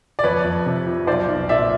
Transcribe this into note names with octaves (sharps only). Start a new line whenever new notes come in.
D5
F2 B4 C#5
F2
C3
F3
B1 C5 D5
B1
A#2 D5 E5